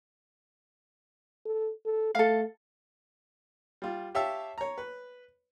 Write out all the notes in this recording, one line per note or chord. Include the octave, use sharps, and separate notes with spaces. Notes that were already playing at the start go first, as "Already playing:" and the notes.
A4
A4
A3 A4 F5
G3 F4
G4 C#5 E5 F5 A5 E6
C#5 A#5
B4